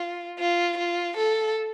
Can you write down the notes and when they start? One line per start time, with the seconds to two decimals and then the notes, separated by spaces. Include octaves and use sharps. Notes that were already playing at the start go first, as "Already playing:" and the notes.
Already playing: F4
0.39 F4
0.78 F4
1.17 A4